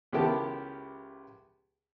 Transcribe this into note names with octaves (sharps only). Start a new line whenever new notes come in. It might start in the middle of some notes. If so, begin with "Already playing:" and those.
C#2 B3 E4 G4 A#4 A5